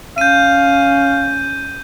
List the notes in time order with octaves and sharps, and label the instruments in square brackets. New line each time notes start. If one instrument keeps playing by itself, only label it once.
[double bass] C#4 [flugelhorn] F5 [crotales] G6 D#7